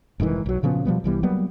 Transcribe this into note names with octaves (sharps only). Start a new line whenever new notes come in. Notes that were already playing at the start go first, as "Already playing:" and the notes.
F1 G#2 D#3 E3
B1 F#3
A#2 C#3 F3 B3
B2 F3 G3 B3
C2 E3 G3 B3
F#3 G3 A#3 B3